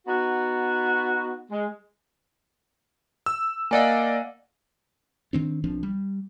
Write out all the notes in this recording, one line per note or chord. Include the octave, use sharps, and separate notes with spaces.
B3 D#4 F#4
G#3
E6
A#3 D5 D#5 F5 F#5 G#5
D#3 C4 D4
B1 F3 C4 D4
G3